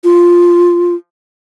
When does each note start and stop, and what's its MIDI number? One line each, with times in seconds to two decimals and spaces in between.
0.04 0.95 65